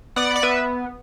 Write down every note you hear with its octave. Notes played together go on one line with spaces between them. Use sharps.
B3 D5 F#5
D5
B3 B4 E5